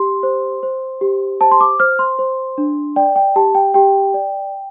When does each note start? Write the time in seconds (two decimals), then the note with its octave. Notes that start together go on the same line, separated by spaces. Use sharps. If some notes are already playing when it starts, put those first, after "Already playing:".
Already playing: G4 C6
0.23 C5
0.63 C5
1.01 G4
1.41 C5 A5
1.51 C6
1.61 D6
1.80 C5 F6
1.99 C6
2.19 C5
2.58 D4
2.96 D5 G5
3.16 G5
3.36 G4 A5
3.55 G5
3.74 G4 G5
4.14 D5